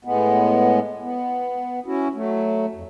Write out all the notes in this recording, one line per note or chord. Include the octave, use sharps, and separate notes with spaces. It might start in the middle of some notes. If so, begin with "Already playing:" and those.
A2 G#3 B3
B3
C#4 E4 F#4
F#3 A3
F2